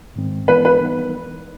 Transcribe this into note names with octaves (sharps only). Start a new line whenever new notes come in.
G#2 D#3 G#3 C4
E3 G#3 B3 E4 B4
B4
E3 G3 B3 D#4